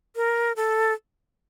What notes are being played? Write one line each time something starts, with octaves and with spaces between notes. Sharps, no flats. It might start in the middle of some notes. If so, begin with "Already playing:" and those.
A#4
A4